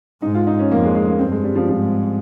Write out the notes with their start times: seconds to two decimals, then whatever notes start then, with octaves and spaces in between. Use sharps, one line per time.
0.22 G#2 D#4
0.34 F4
0.47 D#4
0.59 C#4
0.71 F2 A#3
0.83 G#3
0.95 G#3
1.08 A#3
1.19 G2 C4
1.32 G#3
1.44 G3
1.55 F3
1.68 G#2 F3